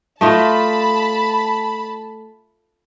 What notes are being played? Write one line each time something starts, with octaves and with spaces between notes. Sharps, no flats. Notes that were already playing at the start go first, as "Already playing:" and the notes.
A3 D#4 F4 A5 B5